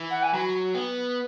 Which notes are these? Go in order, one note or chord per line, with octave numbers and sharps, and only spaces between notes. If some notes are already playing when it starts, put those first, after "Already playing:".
Already playing: E3
F#5
G#5
F#3 B5
B3